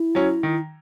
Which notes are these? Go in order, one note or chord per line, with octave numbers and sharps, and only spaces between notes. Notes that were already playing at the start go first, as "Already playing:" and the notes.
Already playing: E4
F#3 C#4
D#3